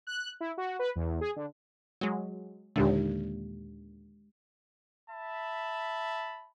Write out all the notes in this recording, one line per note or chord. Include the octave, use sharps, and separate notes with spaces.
F#6
E4
F#4
B4
E2
G#4
D3
F#3 G#3
D#2 A#2 D3 G#3 D4 G4
E5 A5 B5